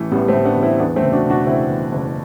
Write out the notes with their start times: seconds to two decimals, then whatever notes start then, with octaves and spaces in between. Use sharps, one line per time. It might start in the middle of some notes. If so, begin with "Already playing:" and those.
Already playing: A1 A2 E3 A3
0.12 A1 G3 B3
0.28 A3 C4
0.34 A2
0.45 B3 D4
0.56 A1
0.62 C4 E4
0.80 E2 B3 D4
0.96 A3 C4
1.02 F#1
1.12 D4 F#4
1.24 B2
1.30 D4 F#4
1.46 F#1 C4 E4
1.69 E2
1.91 F#1